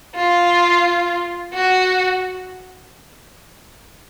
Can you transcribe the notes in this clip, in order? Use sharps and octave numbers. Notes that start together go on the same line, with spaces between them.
F4
F#4